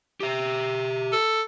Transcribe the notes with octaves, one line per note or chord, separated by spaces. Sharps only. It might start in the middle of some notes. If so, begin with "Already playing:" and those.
G4 E5
A4